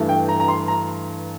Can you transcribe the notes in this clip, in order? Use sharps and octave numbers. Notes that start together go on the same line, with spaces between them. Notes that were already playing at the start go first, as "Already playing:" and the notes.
Already playing: G2 E3 A3
G5
A#5
A#5
C6
A#5